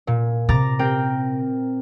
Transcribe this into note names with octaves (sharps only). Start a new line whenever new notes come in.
A#2
C3 A#5 D6 A6
C4 A#4 G5